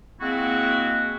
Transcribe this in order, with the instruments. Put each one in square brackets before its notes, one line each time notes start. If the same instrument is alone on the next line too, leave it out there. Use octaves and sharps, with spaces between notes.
[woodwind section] G#3 A#3 C4 E4 F#4